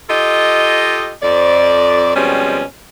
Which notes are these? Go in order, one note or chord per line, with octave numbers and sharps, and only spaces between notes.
F4 G4 A4 D#5
F2 D5
B2 F3 G3 G#3 C4 C#4